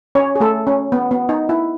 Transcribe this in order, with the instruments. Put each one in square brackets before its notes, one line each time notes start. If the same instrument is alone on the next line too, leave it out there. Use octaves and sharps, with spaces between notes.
[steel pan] C#4 C#5
G#4
A3 A4
C#4
B3
B3
D#4
E4